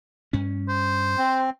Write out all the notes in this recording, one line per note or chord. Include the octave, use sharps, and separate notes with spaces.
G2 C#4
C5
C4